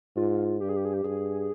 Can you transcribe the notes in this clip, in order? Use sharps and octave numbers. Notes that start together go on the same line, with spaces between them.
G#2 F4
G2 G4
G#4
G4
G#4
G4
G2 G#4